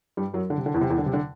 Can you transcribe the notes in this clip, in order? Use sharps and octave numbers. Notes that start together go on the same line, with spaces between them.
G2 G3
F#2 F#3
D3
C3
D3
E2 E3
C3
E2 E3
D3
C3
D3